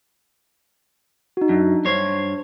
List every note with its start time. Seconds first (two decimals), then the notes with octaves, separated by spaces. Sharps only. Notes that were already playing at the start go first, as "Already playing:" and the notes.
1.37 D#4 F#4
1.49 F#2 D4
1.85 G2 C5 C#5